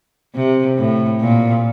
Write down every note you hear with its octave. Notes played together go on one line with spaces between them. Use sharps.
C3
A2
A#2